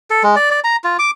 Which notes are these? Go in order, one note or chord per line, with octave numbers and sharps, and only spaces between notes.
A4
G#3
D5
D5
A#5
F4
D6